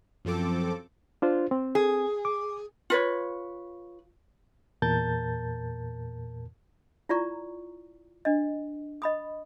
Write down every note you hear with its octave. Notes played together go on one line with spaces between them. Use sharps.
F#2 F3 C4 A4 D6
D4 F4 C5
C4
G#4
D6
F4 B4 C#5
E2 A#2 A#4 A5 G6 A6
E4 F4 D5 A#5 C#6
D4 D#5
D#5 B5 D#6